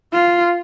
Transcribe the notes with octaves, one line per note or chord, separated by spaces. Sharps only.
F4